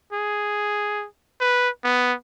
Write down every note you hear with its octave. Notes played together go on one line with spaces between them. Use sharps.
G#4
B4
B3